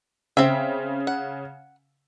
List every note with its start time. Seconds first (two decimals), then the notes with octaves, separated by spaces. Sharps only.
0.37 C#3 C4 E5
1.07 F#5